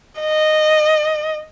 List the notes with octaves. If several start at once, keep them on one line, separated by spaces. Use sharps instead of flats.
D#5